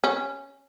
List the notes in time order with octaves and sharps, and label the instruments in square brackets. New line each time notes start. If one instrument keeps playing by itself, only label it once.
[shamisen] C#4